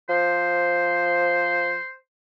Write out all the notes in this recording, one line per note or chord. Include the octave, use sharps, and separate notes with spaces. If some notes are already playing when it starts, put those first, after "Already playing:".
F3 C5